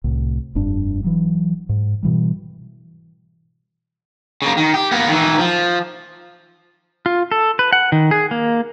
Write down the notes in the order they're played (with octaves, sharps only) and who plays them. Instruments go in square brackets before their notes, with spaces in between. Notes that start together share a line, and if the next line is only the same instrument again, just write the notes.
[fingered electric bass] C2 A2
F1 G2 D4
E3 F#3
G#2
B2 E3 G3
[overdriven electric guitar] C#3 A#3
D#3
G4
A#3 B3
D#3 E3
F3
[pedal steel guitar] F4
A4
B4
F#5
D#3
G#4
A#3